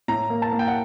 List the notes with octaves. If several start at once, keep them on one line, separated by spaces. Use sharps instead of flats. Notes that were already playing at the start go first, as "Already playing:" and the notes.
A2 A#5
A#3
A5
A#3
G5
F#5